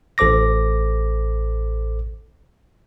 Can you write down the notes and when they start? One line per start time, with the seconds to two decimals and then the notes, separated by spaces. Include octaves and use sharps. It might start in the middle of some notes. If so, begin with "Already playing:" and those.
0.18 A1 A4 C5 D6 A#6